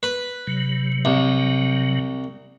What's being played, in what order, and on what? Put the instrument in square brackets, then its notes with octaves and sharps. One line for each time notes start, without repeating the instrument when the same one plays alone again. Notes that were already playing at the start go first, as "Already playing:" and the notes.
[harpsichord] B4
[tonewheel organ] C3 F#3
[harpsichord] C2